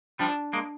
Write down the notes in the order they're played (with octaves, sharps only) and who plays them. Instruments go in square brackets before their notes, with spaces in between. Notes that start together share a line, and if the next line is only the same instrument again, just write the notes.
[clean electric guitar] F3 G3 [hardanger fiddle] D4
[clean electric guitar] G#3 A#3